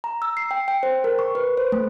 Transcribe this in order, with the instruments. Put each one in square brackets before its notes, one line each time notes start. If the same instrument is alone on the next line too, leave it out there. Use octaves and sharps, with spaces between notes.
[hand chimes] A#5
E6
C7
G5
G5
C5
A#4
C#6
B4
C5
A3